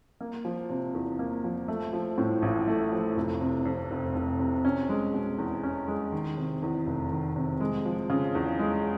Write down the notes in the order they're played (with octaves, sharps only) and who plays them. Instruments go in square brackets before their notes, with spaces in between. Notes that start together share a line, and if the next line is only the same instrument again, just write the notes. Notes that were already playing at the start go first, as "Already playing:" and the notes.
[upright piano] A#3
F3
C3
E2
A#3
F3
A3
F3
A2
A1
A3
F3
F1
C3
F2
F1
F1
C3
C#4
G#3
B2
E2
C#4
G#3
D#3
C3
E2
F1
D#3
C3
G#3
F3
C#3
E2
G#3